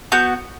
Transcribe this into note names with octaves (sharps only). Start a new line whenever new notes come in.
B3 F#4 G6